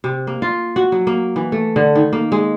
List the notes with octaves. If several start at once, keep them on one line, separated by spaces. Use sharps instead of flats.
C3
A#3
F4
F#4
F#3
A#3
E3
A3
D3
D#3
A#3
G#3